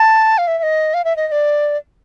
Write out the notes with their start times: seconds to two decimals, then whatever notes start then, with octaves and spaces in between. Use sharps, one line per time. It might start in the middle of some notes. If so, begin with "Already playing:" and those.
Already playing: A5
0.38 F5
0.47 E5
0.58 E5
0.63 D#5
0.94 F5
1.04 E5
1.16 D#5
1.28 D#5
1.32 D5